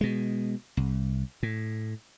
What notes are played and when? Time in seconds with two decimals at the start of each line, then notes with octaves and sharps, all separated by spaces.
0.01 B2 G#3
0.77 C2
1.43 A2